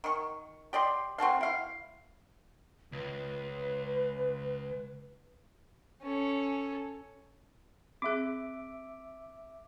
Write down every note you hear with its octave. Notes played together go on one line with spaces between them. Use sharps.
D#3 C#6
G4 D5 D#5 C6
C4 F#4 A4 F5
E4 F5
C#2 B4
C#4 A4
C4 G#4 E5 D6